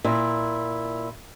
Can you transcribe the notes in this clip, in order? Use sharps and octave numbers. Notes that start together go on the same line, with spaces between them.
A#2 E4